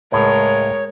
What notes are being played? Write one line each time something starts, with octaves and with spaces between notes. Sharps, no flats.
C#2 A2 G#3 A#4 C#5